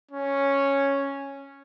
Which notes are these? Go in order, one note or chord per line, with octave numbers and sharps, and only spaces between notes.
C#4